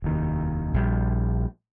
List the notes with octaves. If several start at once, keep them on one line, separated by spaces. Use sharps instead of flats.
F1 D#2 D#3
A#1 G3